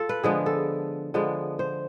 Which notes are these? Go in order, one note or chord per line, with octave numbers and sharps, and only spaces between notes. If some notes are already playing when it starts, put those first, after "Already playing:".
Already playing: F4 A4
B4
D3 F3 G#3 B3 G#4
A4
D3 F3 G#3 B3
C5